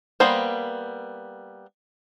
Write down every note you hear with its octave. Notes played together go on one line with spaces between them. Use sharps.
G3 A#3 B3 C5